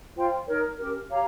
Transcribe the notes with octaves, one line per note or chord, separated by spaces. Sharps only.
F4 C5 G5
D#4 A#4 C#5
C#4 G4 A#4
G4 C#5 F5 A#5